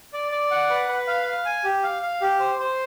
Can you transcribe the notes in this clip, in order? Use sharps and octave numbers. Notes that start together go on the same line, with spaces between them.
D5
D5
F#5
B4
B4
F5
F5
G#5
G4
F5
F5
G4
C5
C5